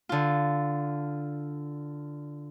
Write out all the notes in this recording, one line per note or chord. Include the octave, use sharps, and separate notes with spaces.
D3 F4